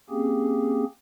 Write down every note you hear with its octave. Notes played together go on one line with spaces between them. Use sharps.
A#3 C4 C#4 G4 G#4